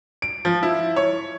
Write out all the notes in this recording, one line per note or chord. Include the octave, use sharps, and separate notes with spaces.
D7
F3
E4
C#5